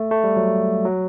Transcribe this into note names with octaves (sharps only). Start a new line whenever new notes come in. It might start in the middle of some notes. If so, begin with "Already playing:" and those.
Already playing: A3
A3
G3
F#3
F#3